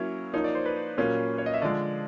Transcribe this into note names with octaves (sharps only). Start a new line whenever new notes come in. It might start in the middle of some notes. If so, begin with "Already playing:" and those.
Already playing: F#3 A#3 C#4 E4 C#5
F3 A#3 D#4 C#5
D5
C5
B4
A#2 F#3 A#3 C#4
C#5
D#5
E5
D3 F3 G#3 D5